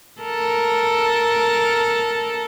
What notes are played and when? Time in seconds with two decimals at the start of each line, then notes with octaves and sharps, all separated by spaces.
0.22 A4 A#4